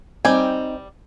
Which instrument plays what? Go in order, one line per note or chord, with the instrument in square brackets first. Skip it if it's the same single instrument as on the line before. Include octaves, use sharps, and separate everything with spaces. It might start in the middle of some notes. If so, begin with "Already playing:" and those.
[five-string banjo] G3 G5 G#5 [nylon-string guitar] C4 D#4